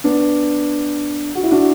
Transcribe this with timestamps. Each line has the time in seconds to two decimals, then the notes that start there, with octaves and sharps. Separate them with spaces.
0.04 B3 D4
1.35 F#4
1.43 E4
1.51 D4 F#4